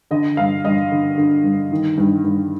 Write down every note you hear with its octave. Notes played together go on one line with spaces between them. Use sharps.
D3 D#5
G2 F5
G2 D#5
D3
D3
G2
D#3
G2
G2